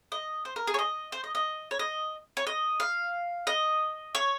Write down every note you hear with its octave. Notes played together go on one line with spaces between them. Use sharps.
D#5
C5
A#4
G#4
C#5
D#5
C5
D#5
D#5
C#5
D#5
C#5
D#5
F5
D#5
C#5